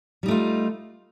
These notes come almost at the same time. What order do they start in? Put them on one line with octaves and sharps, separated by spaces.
G3 D#4 A3 F4